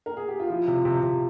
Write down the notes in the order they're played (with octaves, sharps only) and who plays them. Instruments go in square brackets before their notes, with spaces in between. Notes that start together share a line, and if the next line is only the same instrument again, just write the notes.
[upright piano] A#4
G#4
G4
F4
[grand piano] F3 [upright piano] E4
[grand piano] C3
C3
C3